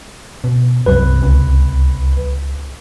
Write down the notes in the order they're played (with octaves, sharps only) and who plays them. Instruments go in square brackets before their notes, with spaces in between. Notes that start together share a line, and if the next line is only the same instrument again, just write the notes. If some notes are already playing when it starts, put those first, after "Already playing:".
[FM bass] B2
[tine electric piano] C2 B4 [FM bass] F#2
[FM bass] C#2